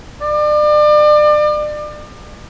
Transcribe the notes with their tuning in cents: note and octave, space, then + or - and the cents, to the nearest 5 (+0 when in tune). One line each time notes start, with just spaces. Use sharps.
D5 +35